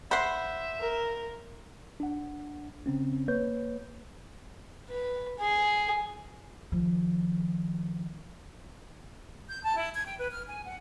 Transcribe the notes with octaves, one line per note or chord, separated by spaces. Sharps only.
C5 E5 F#5 B5 C6
A#4
D4 F#5
C#3 C4 C#4
A#3 B4 C#5 G6
B4
G#4
D#3 F3
G6
A5
E4
G#6
G5
B4
F6
G#5
F#5